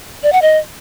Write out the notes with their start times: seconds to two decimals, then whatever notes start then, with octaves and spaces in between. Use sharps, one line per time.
0.23 D5
0.33 F#5
0.42 D#5